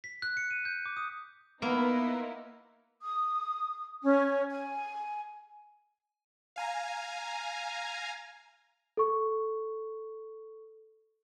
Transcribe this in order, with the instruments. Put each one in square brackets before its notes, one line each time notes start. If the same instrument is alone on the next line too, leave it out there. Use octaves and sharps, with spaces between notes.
[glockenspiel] B6
F#6
C#7
D#7
G6
D6
D#6
[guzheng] A#3 [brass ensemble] B3 [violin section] D#4 E4 A#4 [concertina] B4 C6 E6
[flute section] D#6
C#4
G#5
[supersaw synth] F5 G#5 A#5
[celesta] A4 C#6